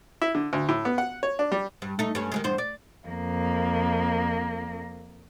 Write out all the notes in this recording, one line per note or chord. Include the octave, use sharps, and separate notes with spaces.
E4
D3
D2
A2
B3
F#5
C#5
D4
G3
G2
A3 D#4
G2 C#4
D#3 F#3 G#3
E2 G2 C5
D5
F2 A#3